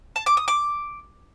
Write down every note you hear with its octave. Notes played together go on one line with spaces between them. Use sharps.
A5
D6
D#6
D6